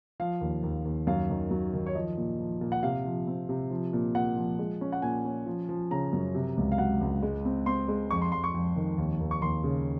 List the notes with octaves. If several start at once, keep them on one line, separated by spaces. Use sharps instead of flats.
F3 F5
D#2
D#2
D#2
F#2 F5
D#3
F#3
D#3
C#5
F3 D#5
A#2
F3
A#2
F#5
C3 F5
F3
C4
C3
F3
A#2
A#2 F#5
F3
G#3
C#4
F#5
A#2 G#5
C#4
F3
F3
C#3 A#5
F#2
C3
C#2
F5
F#3 F#5
C#2
G#3
C4
C4 C6
G#3
F2 C#6
C6
F2 C6
C#6
F2
D#3
D#2
D#2
C#6
D#2 C6
C#3